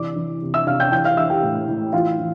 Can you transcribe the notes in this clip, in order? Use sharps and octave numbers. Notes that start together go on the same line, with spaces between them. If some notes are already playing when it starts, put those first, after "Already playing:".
Already playing: C3 E3 D5 D6
E3
C3
E5 E6
C3 F5 F6
G5 G6
E3 G5 G6
F5 F6
E3 E5 E6
G4 G5
A2
A2
E3 F4 F5
E3